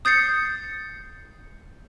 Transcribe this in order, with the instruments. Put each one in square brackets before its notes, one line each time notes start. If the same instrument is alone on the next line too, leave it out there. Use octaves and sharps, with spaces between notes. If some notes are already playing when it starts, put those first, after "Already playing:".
[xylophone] D#6 G6 A6 C7 C#7